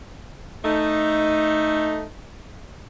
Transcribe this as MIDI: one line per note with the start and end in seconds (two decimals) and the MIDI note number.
0.64 2.02 57
0.64 2.02 63